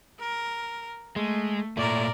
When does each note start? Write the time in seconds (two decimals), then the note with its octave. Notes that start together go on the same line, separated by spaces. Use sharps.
0.20 A#4
1.16 G#3 A3
1.77 A#2 A3 A#4 D5